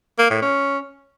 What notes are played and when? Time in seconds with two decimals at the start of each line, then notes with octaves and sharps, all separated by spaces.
0.19 A#3
0.30 A2
0.42 C#4